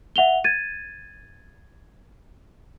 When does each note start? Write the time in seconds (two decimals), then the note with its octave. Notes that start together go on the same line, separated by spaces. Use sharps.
0.16 E5 F#5 F7 G7
0.44 G#6 A6 D#7